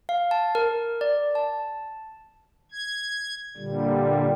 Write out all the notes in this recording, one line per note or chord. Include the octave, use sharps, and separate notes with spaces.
F5
A5
A#4
D5
A5
G#6
A#2 D3 G3